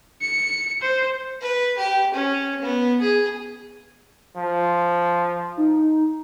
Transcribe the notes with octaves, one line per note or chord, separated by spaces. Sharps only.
C#7
C5
B4
G4
C#4
B3
G#4
F3
D#4